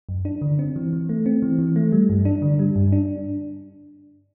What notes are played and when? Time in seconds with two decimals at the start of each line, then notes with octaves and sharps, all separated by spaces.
0.09 F#2
0.25 D4
0.42 D3
0.59 C4
0.76 E3
0.93 E3
1.09 A3
1.26 C4
1.42 E3
1.59 E3
1.76 A3
1.92 G3
2.09 G2
2.25 D4
2.42 D3
2.59 G3
2.76 G2
2.92 D4